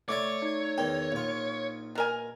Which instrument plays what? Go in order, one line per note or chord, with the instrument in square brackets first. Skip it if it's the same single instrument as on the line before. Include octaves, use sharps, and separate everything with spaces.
[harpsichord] A3 E4 D5 [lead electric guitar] C#5 [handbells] D6
[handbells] D#4
[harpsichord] E2 D#3 [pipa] G5
[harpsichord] A#1 F4
[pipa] B2 A#4 G#5